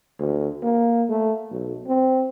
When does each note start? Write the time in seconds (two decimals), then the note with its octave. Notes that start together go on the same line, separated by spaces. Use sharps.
0.19 D2
0.63 A#3
1.10 A3
1.51 B1
1.87 C4